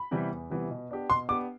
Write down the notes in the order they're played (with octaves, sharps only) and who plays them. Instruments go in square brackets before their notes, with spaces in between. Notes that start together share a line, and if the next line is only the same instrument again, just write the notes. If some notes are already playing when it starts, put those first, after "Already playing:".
Already playing: [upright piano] B5
[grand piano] C3 E3 G3 B3
E2
C3 E3 G3 B3
B2
B3 D4 G4
[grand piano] B2 [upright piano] C6
[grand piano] B3 D4 G4 [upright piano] D6